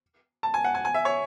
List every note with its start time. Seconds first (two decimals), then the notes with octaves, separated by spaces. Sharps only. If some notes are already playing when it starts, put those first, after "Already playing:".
0.43 A5
0.54 G#5
0.64 F#5
0.75 G#5
0.85 G#5
0.94 E5
1.05 C#5